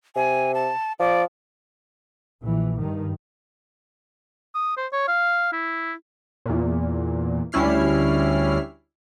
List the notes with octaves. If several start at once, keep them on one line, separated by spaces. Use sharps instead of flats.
C3 G#5
A5
F3 D5
A#1 E3
G2 D#3
D#6
C5
C#5
F5
E4
E2 A#2
D2 G3 C#4 E4 F6 C7